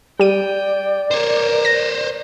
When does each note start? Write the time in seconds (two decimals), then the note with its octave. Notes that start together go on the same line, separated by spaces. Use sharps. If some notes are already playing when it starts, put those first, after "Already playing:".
0.20 G3 D5 G5 D#7
1.11 A#4 C5 C#5
1.65 A#6